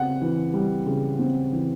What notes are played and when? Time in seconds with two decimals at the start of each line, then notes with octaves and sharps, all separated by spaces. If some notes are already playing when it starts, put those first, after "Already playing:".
Already playing: C#3 C4 F#5
0.22 E3
0.54 G3
0.86 C#3
1.19 C4
1.52 E3